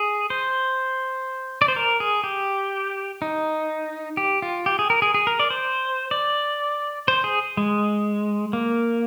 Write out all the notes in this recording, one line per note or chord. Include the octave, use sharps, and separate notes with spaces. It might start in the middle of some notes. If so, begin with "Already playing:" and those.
Already playing: G#4
C5
D5
C5
A#4
G#4
G4
D#4
G4
F4
G4
G#4
A#4
G#4
G#4
A#4
D5
C5
D5
C5
G#4
G#3
A#3